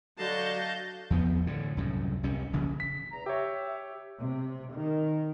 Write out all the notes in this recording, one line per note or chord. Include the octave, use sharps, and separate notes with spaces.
D3 F#3 D#5 F5 A5 G6
E2 F3 B3
A2 D3
C2 F#2 A2
C2 C3 C#4
D#1 A#1 C#3
B6
E2 A#5
G4 C#5 E5
C3
D#3